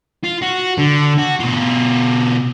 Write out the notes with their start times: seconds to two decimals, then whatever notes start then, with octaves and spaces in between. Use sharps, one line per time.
0.24 F4
0.42 F#4
0.78 D3
1.18 F#4
1.40 B2 F4